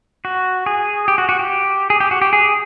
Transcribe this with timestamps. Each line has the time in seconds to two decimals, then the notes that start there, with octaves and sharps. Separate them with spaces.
0.25 F#4
0.66 G#4
1.08 G4
1.18 F#4
1.29 F#4
1.39 G4
1.90 G#4
2.00 G4
2.11 F#4
2.22 G4
2.33 G#4